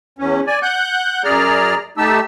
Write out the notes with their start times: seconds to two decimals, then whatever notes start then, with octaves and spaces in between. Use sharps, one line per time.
0.19 E2 C#4
0.47 D5 G#5
0.62 F#5 F#6 G6
1.24 F#2 G#4 D5 A#5 F6
1.97 A3 D#4 G4 A5 E6